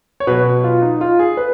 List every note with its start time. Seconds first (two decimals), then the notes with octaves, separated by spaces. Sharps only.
0.20 C#5
0.27 B2 F#3 B4
0.64 F4
0.82 D#4
1.01 F4
1.19 G#4
1.37 B4